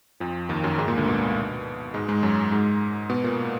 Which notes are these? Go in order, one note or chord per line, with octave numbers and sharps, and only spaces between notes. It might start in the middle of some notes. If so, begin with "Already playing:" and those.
F2 F3
D#2 D#3
F#2 F#3
G#2 G#3
A#2 A#3
D2 D3
B2
G#2 G#3
G#2 G#3
F#2 F#3
G#2 G#3
B2 B3
A#2 A#3